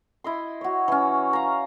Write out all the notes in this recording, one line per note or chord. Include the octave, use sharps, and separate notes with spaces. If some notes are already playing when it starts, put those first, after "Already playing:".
E4 D#5 C6
F#4 C#5
E3 C#4
F5 A#5